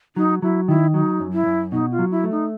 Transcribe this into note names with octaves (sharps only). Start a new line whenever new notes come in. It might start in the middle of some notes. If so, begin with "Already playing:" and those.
F#3 D#4
F#3 E4
D#3 E4
F#3 D#4
F#2
E4
F#2
B2 D#4
F4
F#3
E4
A3
D#4